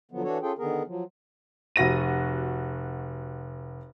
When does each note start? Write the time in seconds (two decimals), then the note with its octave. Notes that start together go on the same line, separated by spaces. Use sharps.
0.12 D3 F3 F#3 B3
0.23 E3 D4 F#4 A4 C#5
0.42 C#4 F4 G#4 A4 G5
0.58 D3 D#3 B3 G#4 A#4
0.87 F3 F#3
1.76 F1 F#4 A#6 D#7